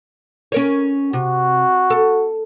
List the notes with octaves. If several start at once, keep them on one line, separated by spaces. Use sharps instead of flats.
C#4 A#4 C#5
C3 F#4
A4